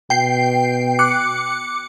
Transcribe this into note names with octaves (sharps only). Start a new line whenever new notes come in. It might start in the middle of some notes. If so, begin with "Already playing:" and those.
B2 G5 C7
D6 F#6 C#7